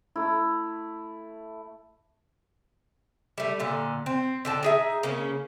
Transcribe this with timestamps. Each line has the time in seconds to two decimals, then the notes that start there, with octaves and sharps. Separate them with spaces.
0.16 A3 E4
3.38 G3 A3
3.59 A#2 D3
4.06 C4
4.45 D3 G5 A5
4.63 D#4 G#4 E5
5.03 C#3 A#3 C#4